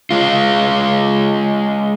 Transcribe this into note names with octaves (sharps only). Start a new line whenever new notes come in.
G#3 F4